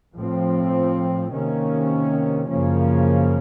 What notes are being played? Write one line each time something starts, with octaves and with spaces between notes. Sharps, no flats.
A2 F3 C4
C3 D#3 A#3 C#4
F#2 C#3 F3 A#3 C#4